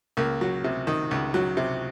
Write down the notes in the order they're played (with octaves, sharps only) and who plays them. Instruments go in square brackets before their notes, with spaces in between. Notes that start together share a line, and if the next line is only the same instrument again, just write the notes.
[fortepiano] C#2 A#3
F#3
C3
D#3
C#2
F#3
C3